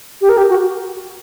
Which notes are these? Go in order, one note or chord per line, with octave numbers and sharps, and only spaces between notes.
G4
A#4
G4
F#4